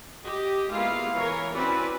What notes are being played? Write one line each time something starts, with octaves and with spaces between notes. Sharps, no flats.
G4 D#5
G#3 A#3 B3 E4 F4 F5
E3 A#4 C#5
C4 C#4 E4 F#4 B4 D5